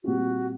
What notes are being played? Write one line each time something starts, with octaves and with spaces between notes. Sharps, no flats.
A#2 G3 C4 F4 F#4